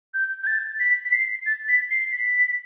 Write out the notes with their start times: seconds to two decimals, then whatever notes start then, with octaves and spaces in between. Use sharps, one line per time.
0.14 G6
0.43 G6
0.47 A6
0.80 B6
1.05 B6
1.13 C7
1.46 A6
1.68 B6
1.91 C7
2.12 B6